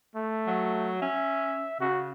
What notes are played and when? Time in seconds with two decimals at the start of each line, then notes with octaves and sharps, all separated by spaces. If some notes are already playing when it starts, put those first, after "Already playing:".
0.16 A3
0.47 F#3
1.02 C#4 E5
1.81 C#3 F#4